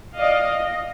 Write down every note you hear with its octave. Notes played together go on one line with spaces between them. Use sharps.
D5 D#5 F5
D#5